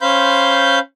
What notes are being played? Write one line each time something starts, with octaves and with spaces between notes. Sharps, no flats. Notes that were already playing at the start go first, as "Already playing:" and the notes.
C#4 C5 F5 B5 C6 G6